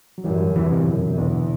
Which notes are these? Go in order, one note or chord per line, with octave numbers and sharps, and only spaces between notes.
F#3
F#2 E3 G3
G3
D3 F#3
E2 C3 E3
A2 C3
F#2 B2 D3
C3 E3
E2 B2 D3